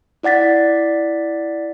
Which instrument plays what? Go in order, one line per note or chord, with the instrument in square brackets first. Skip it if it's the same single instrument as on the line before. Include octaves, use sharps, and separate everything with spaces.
[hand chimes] E4 D5 F#5 A6 B6